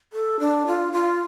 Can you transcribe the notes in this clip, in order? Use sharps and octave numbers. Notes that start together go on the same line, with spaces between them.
A4
D4
F4
F4